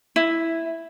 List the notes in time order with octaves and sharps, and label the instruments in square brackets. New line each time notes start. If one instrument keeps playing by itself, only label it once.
[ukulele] E4